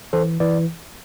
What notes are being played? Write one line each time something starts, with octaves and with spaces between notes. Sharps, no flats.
E3 A4 C5
E3 B4 D5